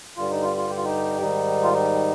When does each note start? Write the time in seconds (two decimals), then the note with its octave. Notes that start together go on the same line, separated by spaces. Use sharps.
0.17 G2 D3 G3 F4
0.31 D#4
0.43 F4
0.57 F4
0.69 G4
0.77 F4
0.84 D#4 G4
1.21 G#2 D#3 G3 D#4
1.64 F4
1.73 D#4